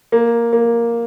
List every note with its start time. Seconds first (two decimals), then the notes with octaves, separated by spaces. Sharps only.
0.12 A#3
0.53 A#3